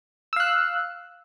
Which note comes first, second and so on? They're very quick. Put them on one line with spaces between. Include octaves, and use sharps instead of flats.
E6 F5 F#6